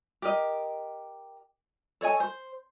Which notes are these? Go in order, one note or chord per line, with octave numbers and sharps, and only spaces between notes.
G4 A#4 D#5
A4 C#5 D#5 G#5
C5